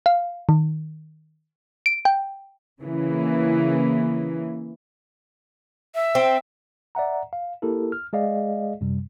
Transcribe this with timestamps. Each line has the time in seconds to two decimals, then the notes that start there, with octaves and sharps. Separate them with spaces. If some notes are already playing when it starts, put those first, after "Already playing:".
0.06 F5
0.49 D#3
1.86 D7
2.05 G5
2.80 C#3 E3 A#3
5.95 E5
6.15 C4
6.95 D5 E5 F#5 A#5
7.33 F5
7.62 A#3 E4 G4 A4 A#4
7.92 F6
8.13 G#3 G#4 D5 D#5 F5
8.81 F#2 C3 G3